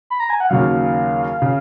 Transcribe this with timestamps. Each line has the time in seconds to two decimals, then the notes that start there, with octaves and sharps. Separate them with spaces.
0.10 B5
0.20 A#5
0.30 G#5
0.40 F#5
0.50 D#2 C#3 F#3 F5
1.42 C#3